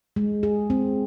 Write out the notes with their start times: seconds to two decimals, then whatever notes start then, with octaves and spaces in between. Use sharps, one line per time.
0.16 G#3
0.43 G#4
0.70 C4